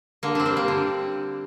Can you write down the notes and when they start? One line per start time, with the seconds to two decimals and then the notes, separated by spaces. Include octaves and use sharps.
0.23 D3 A#3
0.35 C4 D4
0.46 G3
0.57 A#3
0.68 D3